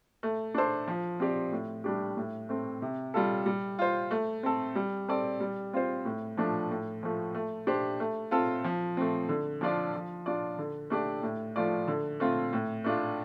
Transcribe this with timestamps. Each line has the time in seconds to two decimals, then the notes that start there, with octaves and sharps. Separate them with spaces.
0.23 A3
0.55 D4 A4 C5
0.88 F3
1.20 C4 G4 D5
1.52 A2
1.84 G3 D4 G4
2.17 A2
2.49 A3 C4
2.82 C3
3.14 G3 F4 A4
3.46 G3
3.79 F4 C5
4.11 A3
4.43 C4 A4
4.75 G3
5.08 C4 A4 D5
5.40 G3
5.73 C4 F4 C5
6.05 A2
6.37 F3 A3 D4
6.71 A2
7.03 F3 A3
7.35 A3
7.67 D4 G4 C5
8.00 A3
8.31 C4 F4 A4
8.64 F3
8.97 A3 C4
9.29 D3
9.61 F3 D4 F4 D5
9.94 F3
10.26 D4 F4 D5
10.58 D3
10.90 A3 D4 G4 D5
11.22 A2
11.56 F3 A3 F4 D5
11.87 D3
12.20 A3 C4 F4
12.53 A2
12.84 A3 D4 F4